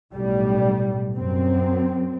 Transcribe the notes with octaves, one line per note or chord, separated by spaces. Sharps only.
B1 A2 G3
F#2 C4